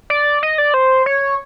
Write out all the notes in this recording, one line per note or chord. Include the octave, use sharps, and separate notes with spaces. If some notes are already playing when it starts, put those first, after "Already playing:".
D5
D#5
D5
C5
C#5